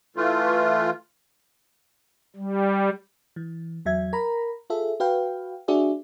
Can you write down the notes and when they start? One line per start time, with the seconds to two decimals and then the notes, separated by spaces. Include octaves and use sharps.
0.16 E3 A3 F4
2.36 G3
3.36 E3
3.85 E2 F#3 E5 G#6
4.13 A#4 A#5 B5
4.70 F4 G#4 A4 E5
5.00 F#4 B4 F5 G5
5.68 D4 F#4 G#4 D5 E5